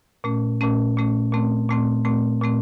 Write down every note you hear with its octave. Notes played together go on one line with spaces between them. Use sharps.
A#2 A3 C#4
A#2 A3 C#4
A#2 A3 C#4
A#2 A3 C4
A#2 A3 C4
A#2 A3 C4
A#2 A3 C4